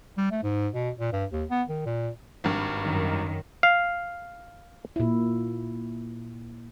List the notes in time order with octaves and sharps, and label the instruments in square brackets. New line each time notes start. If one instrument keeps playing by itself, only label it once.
[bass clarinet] G3
A3
G#2
B2
A#2
G2
D#2
B3
D#3
A#2
[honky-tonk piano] G#1 G2
[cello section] F#2 D#3
[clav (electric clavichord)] F5
[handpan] A#2 E4